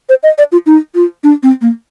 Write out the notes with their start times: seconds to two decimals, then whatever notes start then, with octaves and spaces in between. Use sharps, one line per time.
0.09 C5
0.23 D#5
0.38 D5
0.52 F4
0.66 D#4
0.95 F4
1.24 D4
1.43 C4
1.62 A#3